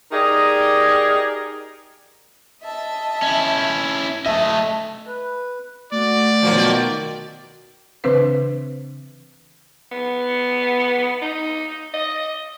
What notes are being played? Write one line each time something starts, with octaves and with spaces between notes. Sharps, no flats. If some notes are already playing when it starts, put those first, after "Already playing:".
D#4 G4 G#4 A#4 D5 D#5
D#5 E5 A5
C#4 E4
A3 D#5 E5 A5
B4
A3 F#4 D5
B2 D#3 F3 F#3 A#3
C#3 E3 C4 D4 B4 C5
B3
D#4
D#5